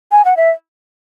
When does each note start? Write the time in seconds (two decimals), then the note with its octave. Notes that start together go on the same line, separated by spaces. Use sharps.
0.12 G#5
0.25 F#5
0.37 E5